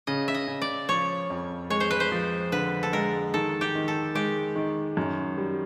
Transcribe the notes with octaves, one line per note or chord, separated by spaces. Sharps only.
C#3 D#5
E5
D#5
C#3
D5
F3 C#5
F2
G#3 C#5
C5
B4
C5
F3
D3 B4
A4
G#3 A#4
D#3 A4
G4
D#3
A4
G#3 G4
D#3
F#2
G3